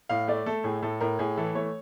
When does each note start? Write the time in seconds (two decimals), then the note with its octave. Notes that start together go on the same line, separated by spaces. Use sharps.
0.09 A2 F5
0.28 A3 D5
0.46 A3 A4
0.64 A2 G#4
0.82 A2 A4
1.01 A2 A#4
1.19 A2 G#4
1.37 E3 A4
1.55 A3 C#5